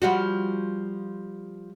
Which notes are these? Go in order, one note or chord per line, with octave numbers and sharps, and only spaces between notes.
F3 G3 F#4